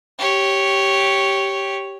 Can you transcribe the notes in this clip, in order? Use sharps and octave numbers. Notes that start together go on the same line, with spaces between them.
G4 C#5